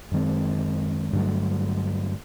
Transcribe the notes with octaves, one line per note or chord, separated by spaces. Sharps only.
F#2 D#3 G#3 C4
G2 D3 F#3 A3